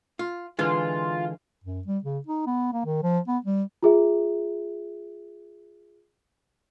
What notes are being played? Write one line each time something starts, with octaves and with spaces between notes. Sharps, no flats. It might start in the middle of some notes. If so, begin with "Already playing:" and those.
F4
D3 E3 G#3 F4
F#2
G3
C#3
D#4
B3
A#3
D#3
F3
B3
G3
F4 G#4 E5